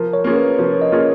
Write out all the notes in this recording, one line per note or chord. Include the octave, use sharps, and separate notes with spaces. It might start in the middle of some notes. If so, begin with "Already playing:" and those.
Already playing: F3 A#4
C#5
A#3 C#4 F4 G#4
B4
F3 C#5
D#5
A#3 C#4 F4 G#4